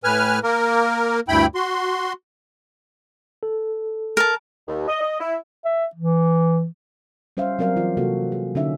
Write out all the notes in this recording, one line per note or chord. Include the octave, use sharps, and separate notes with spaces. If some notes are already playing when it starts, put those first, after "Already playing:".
A2 B4 G#5 F6
A#3 A#4
D2 G2 E4 G5 B5
F#4 C6
A4
A#4 A5
D#2
D#5
D#5
E4
E5
E3
G3 C#4 C5 E5 F5
F#3 C4 A#4 D5 F5
E3 E4 F4
C3 A#3 F#4 A4
G#4
D3 C#4 D#4 E5